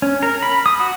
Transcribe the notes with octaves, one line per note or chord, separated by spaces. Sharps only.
C#4
A#4
B5
D#6
F#4